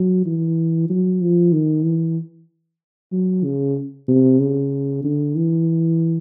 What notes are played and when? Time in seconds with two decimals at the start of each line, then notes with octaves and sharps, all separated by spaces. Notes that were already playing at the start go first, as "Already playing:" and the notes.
Already playing: F#3
0.26 E3
0.90 F#3
1.21 F3
1.53 D#3
1.84 E3
3.12 F#3
3.44 C#3
4.08 C3
4.40 C#3
5.04 D3
5.36 E3